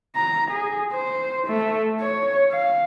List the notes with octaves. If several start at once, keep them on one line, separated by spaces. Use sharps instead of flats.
A#5
G#4
C5
A3
C#5
F5